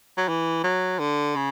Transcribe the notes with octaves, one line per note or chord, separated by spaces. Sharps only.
F#3
E3
F#3
D3
C#3